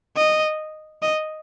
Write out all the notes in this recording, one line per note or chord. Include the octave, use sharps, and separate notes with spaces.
D#5
D#5